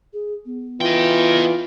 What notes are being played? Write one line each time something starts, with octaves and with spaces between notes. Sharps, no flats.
G#4
B3
E3 F4 D#5 G5